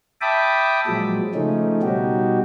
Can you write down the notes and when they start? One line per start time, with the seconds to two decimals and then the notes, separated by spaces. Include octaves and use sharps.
0.21 E5 G5 A5 B5 D6 D#6
0.87 A#2 F3 F#3 G#3
1.35 C#3 F3 A3 C#4 D#4
1.83 B2 G3 D#4 F#4 G4